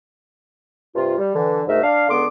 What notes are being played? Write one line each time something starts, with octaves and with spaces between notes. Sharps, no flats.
G2 C3 F4
G3
D3 E3
D2 G#2 A3 A#4 E5
D4 F5
C#2 D3 B3 C6 D6